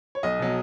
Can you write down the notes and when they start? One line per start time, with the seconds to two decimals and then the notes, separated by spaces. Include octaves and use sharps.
0.15 C#5
0.23 B1 D#5
0.39 B2 F#3